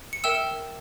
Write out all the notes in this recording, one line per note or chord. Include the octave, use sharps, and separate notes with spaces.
C#7
A#4 E5 G5 E6 E7